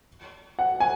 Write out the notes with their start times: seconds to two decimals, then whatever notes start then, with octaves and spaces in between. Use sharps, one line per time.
0.59 F#5
0.80 G#5